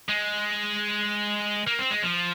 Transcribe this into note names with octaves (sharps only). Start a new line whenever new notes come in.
G#3
A#3
C4
G#3
F3